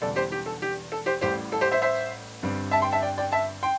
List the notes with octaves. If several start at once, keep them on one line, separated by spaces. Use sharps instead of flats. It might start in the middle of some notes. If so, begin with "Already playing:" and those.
E1 E2 D3 G3 D4 A4 D5
G4 C5
G4
A4
G4
A4
G4 C5
A1 A2 G3 G4 C5
A4
G4 C5
C5 E5
C5 E5
G1 G2 G3 C4
E5 A5
G5 C6
E5 A5
D5 G5
D5 G5
E5 A5
G5 C6